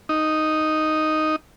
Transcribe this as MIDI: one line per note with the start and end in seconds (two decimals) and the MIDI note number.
0.09 1.36 63